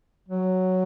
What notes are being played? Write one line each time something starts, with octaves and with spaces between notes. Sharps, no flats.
F#3